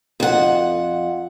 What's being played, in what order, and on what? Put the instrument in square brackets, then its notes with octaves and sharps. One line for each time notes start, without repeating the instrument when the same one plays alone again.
[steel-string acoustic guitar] F2 F#5